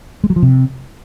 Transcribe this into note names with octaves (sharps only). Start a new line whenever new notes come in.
G#3
F#3
F3
C3